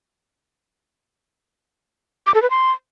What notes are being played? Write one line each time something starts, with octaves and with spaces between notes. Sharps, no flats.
D6
A4
B4
C6